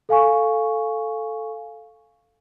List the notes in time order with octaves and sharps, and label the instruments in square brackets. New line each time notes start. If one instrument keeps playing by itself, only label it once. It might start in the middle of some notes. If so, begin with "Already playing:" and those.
[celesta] A4 F5 G#5 C#6